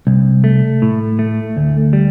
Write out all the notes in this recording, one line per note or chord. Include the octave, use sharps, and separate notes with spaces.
C2
A3
A2
A3
D2
G3